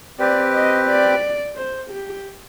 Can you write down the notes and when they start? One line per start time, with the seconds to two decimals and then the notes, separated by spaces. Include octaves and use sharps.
0.19 C4 G4 B4 D5
0.54 D#5
0.87 D5
1.55 C5
1.91 G4